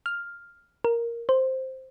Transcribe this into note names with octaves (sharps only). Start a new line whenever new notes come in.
F6
A#4
C5